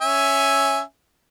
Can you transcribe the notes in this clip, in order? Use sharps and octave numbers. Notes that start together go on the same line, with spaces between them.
C#4 E5 G#5